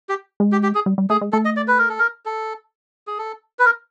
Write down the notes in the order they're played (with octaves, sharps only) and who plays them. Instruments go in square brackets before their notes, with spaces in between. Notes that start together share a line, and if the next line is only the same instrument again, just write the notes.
[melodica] G4
[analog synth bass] G#3
[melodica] G4
G4
G#4
[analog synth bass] G3
G3
[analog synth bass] A3 [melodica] G#4
[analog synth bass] G#3
[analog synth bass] A3 [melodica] A4
[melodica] D#5
D5
B4
A#4
A4
A#4
A4
G#4
A4
B4
A#4